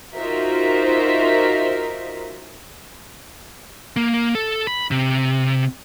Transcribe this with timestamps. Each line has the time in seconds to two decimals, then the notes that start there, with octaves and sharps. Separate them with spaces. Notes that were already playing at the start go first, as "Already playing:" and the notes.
0.16 D#4 F4 F#4 A#4 C5 E5
3.96 A#3
4.35 A4
4.67 B5
4.91 C3